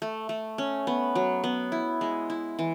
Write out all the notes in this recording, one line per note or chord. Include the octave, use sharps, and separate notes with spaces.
A3
A3
C#4
B3
F#3
B3
E4
G#3
E4
E3